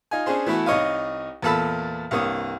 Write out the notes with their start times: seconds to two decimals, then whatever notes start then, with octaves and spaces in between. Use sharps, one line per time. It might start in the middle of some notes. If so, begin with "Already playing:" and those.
0.11 D#4 F4 G#5
0.26 C#4 D4 G#4 C5
0.46 E3 A3 B3 E4 F#4
0.66 C2 D#4 C#5 D#5 F5
1.42 E2 A#2 A4 A5 B5 E6
2.11 C2 G2 A#3 C#5 D#6